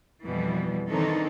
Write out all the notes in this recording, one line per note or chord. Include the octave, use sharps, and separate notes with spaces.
F2 B2 E3 G3
D#3 E3 C4 D4 D#4 A4